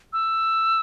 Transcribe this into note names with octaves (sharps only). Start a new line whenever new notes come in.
E6